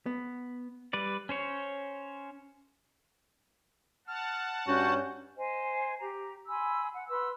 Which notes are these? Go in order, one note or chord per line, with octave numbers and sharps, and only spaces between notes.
B3
G3 B4 D5
C#4 C5 C#5
F#5 A5 F6
G2 C#4 F#4 G6
C5 D#5 G#5
G4 A#5
G#5 B5 C6 E6
F#5
B4 B5 C6 E6